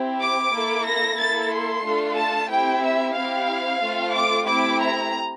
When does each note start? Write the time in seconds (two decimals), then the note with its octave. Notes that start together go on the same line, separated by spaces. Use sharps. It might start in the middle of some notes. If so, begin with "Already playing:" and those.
Already playing: C4 E4 G4
0.20 D6
0.52 A#3 E4 A4
0.85 A#6
1.17 A#3 E4 A4 A6
1.51 C6
1.83 A3 D4 F4 A4
2.17 A5
2.49 C4 E4 G4 G5
2.83 E5
3.14 C4 E4 G4 F5
3.81 A3 C4 F4 A4
4.14 D6
4.46 A3 C4 E4 G4 D6
4.79 A#5